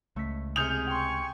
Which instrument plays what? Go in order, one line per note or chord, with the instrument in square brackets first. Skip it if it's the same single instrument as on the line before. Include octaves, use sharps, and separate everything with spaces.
[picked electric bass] C#2 [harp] A3 B6
[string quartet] C3 G#4 [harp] D#6 F6 C#7 [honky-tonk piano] G6 F7
[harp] G5 C6 [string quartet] G#5 C#6